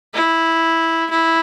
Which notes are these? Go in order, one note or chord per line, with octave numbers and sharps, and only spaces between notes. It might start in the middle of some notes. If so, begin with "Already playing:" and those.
E4
E4